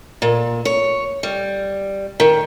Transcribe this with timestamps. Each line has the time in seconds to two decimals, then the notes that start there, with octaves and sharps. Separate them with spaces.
0.22 A#2
0.65 C#5
1.23 G3
2.20 D#3